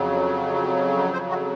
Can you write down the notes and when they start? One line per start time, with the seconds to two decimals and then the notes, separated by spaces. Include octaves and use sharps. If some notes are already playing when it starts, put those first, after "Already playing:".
Already playing: F2 C#3 F#3
1.13 C5
1.29 F#4